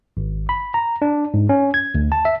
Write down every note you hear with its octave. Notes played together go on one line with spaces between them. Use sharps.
G#1
B5
A#5
D4
G#2
C#4
G#6
D2
A5
E5